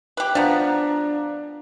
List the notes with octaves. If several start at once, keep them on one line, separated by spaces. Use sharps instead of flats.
G4 B4
F3 B3 D4 A#5